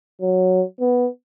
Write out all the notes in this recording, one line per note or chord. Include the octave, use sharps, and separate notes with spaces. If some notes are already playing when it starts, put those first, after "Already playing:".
F#3
B3